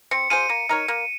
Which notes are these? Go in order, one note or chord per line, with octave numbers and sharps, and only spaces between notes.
C4 C#7
F4 G#4 C5 D#7
A#3 D#7
D#4 A#4 C#5
A#3